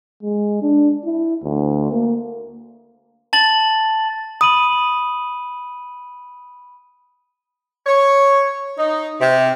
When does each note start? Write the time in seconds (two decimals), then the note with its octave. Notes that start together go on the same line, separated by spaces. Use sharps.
0.23 G#3
0.62 D4
1.05 E4
1.43 D2
1.92 A#3
3.33 A5 A6 F#7
4.41 B5 D#6 D#7 F#7
7.87 C#5
8.77 D#4
9.19 C3